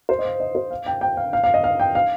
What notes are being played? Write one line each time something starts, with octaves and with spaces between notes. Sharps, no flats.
C5
D#5
F5
D#5
C5
F5
G5
G5
F5
F5
F5
D#5
F5
G5
F5